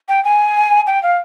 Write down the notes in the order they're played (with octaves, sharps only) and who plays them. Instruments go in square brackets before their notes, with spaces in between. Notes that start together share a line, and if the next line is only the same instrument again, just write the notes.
[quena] G5
G#5
G5
F5